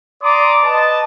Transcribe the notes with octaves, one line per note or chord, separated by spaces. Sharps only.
D5 A#5 C6 D6 D#6
B4 D#5 A5